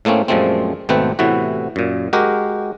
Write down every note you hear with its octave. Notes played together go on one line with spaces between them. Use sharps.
A2 A3 A#3 C4 C#4
F#2 A#2 F3 G#3 A3 C4
G#1 B2 A3 C4 B4 G5
A2 C3 E3 B3 F#4
F#2 A#2
G#3 F#4 G4 A#4